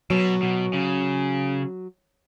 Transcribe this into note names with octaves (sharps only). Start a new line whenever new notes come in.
B2 F#3
B2
C#3